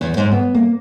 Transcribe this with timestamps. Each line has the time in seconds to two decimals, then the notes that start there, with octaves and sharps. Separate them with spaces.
0.01 E2
0.17 G#2
0.32 B3
0.54 A#3